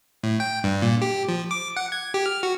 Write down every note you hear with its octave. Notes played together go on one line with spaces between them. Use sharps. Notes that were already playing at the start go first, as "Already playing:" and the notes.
A2
G5
G2
A#2
G4
F3
D6
F#5
G#6
G4
F6
F#4